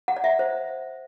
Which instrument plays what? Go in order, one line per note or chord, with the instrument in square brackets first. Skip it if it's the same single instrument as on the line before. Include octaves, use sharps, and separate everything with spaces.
[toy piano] F#5
D5
E5
C5